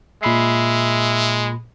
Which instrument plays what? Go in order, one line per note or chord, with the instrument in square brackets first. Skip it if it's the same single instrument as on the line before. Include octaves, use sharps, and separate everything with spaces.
[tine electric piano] A#2 B5 C7 [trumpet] G#3 [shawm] E5